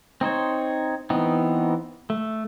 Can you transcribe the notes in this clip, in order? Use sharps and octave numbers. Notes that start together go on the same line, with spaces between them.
C4 D#4 C5 C#5
E3 B3 C4 D#4
A3